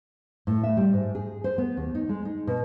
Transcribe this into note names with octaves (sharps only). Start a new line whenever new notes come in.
A2
E5
G3
G#2
G#4
C5
B3
D#2
D#4
G#3
D#4
B2